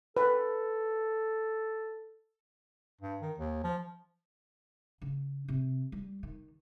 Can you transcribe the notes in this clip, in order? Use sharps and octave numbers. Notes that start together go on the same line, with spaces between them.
A4 B4
G2
D#3
D#2
F3
C#3
C3
G3
D#3